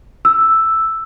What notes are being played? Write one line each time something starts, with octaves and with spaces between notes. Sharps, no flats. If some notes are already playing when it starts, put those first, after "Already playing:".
E6